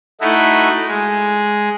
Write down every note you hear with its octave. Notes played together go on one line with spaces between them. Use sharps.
A3 D#4 E4 F#4
G#3